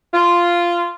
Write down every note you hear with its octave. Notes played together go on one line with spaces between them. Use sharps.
F4